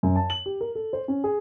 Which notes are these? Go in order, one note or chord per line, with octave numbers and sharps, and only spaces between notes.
F#2
A5
F#7
G4
A#4
A4
C5
C#4
G#4